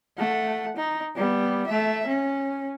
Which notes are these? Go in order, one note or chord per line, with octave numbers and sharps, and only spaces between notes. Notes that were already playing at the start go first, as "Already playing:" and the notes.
A3 F#5
D#4
G3 B3
A3 E5
C#4